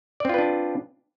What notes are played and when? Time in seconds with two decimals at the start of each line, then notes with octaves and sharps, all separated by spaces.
0.20 D5
0.25 C4
0.29 F4
0.34 B4
0.38 D4